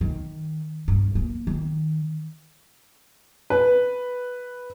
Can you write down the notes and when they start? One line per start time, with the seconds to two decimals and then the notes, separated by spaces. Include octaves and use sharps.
0.01 D#3
0.88 G2
1.15 A#3
1.47 D#3
3.50 B4